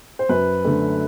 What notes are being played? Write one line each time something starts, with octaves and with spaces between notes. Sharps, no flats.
C5
F#2 B4
D3 A3